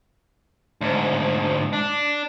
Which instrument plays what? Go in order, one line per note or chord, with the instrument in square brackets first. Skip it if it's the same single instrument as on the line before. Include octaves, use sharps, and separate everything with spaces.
[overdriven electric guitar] D2 G#2
D4